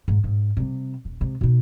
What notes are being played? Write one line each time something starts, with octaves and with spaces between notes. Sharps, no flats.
G#2
G#2
C3 G3
D#1
C3 G#3
B2 D#4